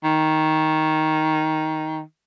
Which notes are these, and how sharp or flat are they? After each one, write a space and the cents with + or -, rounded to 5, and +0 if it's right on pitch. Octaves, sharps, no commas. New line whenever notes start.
D#3 +10